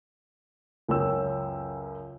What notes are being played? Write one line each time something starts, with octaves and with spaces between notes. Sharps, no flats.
C#2 F#2 C#4 G5 E6